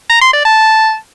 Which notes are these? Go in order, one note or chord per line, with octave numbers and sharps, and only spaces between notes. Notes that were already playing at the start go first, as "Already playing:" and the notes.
A#5
C6
D5
A5